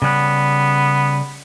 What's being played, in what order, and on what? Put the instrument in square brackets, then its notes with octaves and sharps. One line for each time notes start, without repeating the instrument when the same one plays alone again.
[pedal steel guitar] C#3 G3 F#6 [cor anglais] B3